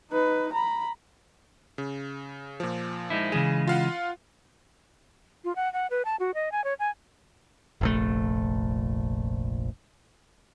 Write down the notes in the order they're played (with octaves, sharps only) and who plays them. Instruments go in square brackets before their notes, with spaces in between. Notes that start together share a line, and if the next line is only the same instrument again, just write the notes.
[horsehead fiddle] D#4 B4
A#5 B5
[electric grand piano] C#3
A#2 F3
[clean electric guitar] G#3 D#4 E4
[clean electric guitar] C#3 E3 G#3 [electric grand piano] G#4
[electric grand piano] F4 F5 F#5
[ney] F4
F#5
F#5
B4
A5
F#4
D#5
G#5
C#5
G#5
[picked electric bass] F1 A#1 A3